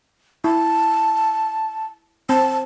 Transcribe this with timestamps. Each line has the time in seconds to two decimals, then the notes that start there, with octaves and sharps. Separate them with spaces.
0.44 E4 A5
2.29 C4 A5